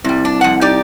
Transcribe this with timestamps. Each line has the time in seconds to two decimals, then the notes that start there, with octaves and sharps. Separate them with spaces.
0.04 C2 C3 G3
0.25 D4
0.41 F2 F#5
0.61 D#4 G4 D5